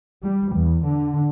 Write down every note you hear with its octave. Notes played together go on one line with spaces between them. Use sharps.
G3
E2
D3